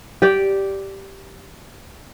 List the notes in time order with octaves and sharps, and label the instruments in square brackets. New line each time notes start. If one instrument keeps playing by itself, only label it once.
[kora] G4 D5 G5